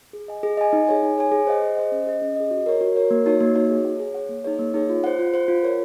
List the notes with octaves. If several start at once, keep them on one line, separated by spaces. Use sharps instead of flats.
G#4
D#5 G#5
G#4
D#5 G#5
D#4
G#4 C#5 G#5
D#4
G#4 C#5 G#5
G#4
C5 D#5 F#5
G#4
C5 D#5 F#5
C#4
G#4 D#5
C#4
G#4 D#5
F#4
A#4 C#5
F#4
A#4 C#5
A#3
D#4 F#4 C#5
A#3
D#4 F#4 C#5
G#4
C#5 F#5
G#4
C#5 F#5
A#3
D#4 G#4 C#5
A#3
D#4 G#4 C#5
F4
C5 F#5
F4
C5 F#5
F4
A#4 C#5